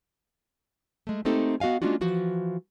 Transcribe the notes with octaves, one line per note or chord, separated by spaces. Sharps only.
G#3 A3
A3 A#3 C4 D#4 G4 A4
B3 F#4 D#5 F5 G#5
G#3 A#3 C#4 D4 F4 F#4
E3 F3 F#4